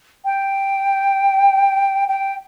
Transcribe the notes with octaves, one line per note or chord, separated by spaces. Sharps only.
G5
G5